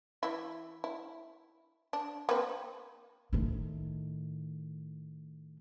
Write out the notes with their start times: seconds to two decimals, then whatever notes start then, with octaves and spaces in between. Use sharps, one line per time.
0.23 E3 E4
0.84 E4
1.93 D4
2.29 A#3 C4 B4
3.33 A2 D#3